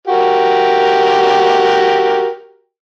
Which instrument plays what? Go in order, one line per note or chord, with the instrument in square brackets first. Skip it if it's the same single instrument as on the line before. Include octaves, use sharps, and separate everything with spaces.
[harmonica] F#4 G4 A#4